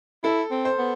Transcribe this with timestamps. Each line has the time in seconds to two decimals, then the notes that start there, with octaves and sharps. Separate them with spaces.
0.24 E4 A4
0.51 C4
0.65 C5
0.78 B3